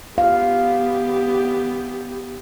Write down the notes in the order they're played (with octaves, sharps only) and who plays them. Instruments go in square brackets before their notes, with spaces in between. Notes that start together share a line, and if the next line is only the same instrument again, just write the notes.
[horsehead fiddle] B3 G4 [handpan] F5